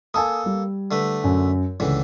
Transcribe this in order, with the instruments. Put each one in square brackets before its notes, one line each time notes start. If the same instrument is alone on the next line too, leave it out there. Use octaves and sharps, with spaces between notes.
[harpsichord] A#3 A4 [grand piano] G#5 A5 D#6
[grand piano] G3
[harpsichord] D3 A3 B4
[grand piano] F#2
[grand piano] C#2 [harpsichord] A2 D3 E3